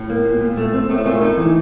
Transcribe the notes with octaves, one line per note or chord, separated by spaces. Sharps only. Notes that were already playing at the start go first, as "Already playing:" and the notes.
Already playing: A2
A#3
A#2
A#2
A3
C4
A2 A3
A#2 A3
A2 D#4
E3